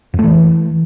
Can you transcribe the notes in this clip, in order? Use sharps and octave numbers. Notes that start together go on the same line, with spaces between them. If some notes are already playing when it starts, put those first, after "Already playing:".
F2
A3
E3